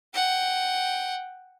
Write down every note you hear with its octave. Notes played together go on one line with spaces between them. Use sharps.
F#5 G5